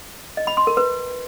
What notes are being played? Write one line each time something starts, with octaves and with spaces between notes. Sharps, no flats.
D#5
B5
C6
A#4
B4